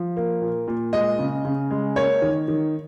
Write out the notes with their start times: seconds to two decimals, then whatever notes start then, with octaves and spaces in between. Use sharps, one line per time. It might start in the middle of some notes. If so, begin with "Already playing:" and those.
Already playing: F3
0.17 A#3
0.41 A#2
0.68 A#2
0.93 G#3 D#5
1.19 C#3
1.45 C#3
1.71 G#3
1.96 A#3 C#5
2.22 D#3
2.48 D#3